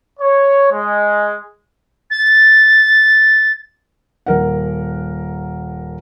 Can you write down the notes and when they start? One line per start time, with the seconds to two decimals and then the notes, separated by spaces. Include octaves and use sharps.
0.20 C#5
0.70 G#3
2.10 A6
4.26 D#1 A#4 F#5